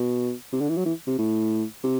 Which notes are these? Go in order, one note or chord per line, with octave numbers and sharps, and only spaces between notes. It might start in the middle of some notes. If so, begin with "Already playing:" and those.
Already playing: B2
C3
D3
E3
F#3
E3
C3
A2
C3